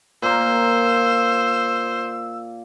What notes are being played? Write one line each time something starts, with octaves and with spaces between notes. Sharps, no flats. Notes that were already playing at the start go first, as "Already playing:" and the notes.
A#2 A#3 C5 E6